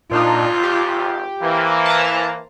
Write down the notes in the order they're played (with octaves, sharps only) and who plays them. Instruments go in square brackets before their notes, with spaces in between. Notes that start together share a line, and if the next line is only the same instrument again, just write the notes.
[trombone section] G#1 F2 [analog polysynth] A#2 D4 D#4 [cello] F4
[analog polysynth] G4
[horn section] E3 [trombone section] A#3 [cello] C5
[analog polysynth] A5 A#5